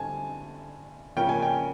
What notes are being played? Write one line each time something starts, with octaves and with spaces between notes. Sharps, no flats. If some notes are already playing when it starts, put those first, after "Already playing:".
Already playing: D3 G3 C4 G#5 A5
C#3 F3 A#3 C#4 G5
G#5
G5